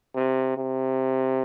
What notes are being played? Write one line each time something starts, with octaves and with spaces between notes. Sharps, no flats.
C3
C3